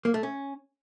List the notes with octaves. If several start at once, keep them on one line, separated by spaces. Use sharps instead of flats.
A#3
A3
C#4